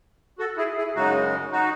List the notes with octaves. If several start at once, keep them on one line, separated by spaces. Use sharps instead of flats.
F#4 A4
E4 G#4
E4 G#4
F#2 C#3 G#3 D#4 F#4
D#4 F#4